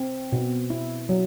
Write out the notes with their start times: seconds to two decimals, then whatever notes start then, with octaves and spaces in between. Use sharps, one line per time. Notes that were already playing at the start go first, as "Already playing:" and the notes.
Already playing: C4
0.32 B2
0.70 E4
1.09 F#3